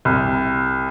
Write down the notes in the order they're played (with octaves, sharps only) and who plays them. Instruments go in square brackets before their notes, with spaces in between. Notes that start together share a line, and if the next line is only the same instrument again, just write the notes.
[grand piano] C2